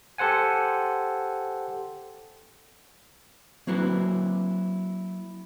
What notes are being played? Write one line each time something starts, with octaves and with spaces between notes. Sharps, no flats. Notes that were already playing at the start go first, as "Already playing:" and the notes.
G4 A4 C5 F#5 G#5
F#3 A#3 C4 E4 F#4 B4